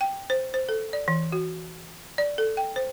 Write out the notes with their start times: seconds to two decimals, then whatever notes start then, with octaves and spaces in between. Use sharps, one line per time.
0.01 G5
0.30 C5
0.54 C5
0.69 A4
0.93 D5
1.08 E3
1.32 F#4
2.18 D5
2.38 A4
2.57 G5
2.76 C5